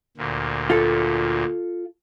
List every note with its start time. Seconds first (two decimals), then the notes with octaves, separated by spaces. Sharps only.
0.17 D2 A#2
0.70 F4 A4